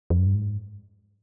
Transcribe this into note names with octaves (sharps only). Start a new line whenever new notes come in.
F2
F#2
G2
G#2